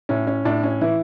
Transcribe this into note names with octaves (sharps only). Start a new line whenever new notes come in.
A2 C#4
C#4
A2 D4
C#4
E3 E4